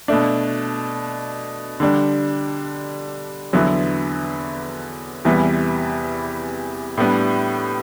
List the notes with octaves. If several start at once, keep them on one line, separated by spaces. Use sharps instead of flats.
B2 A3 D4
D3 G3 D4
E2 D3 F#3 B3 E4
E2 C3 E3 G3 B3
A2 G3 B3 D4